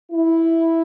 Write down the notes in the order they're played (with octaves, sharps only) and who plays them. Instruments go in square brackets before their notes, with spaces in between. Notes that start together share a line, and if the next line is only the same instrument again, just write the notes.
[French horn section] E4